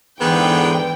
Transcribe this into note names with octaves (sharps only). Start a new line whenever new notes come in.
E2 G#2 D3 E3 B3 G5